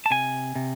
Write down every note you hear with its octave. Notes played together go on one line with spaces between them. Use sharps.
A5
C3 G#5
C3